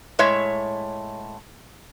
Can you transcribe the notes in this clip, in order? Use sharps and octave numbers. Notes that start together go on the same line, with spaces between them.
A2 G#3 C#5 E5